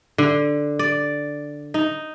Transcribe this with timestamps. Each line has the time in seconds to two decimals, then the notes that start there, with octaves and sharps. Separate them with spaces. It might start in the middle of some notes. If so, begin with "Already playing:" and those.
0.18 D3
0.79 D5
1.74 D#4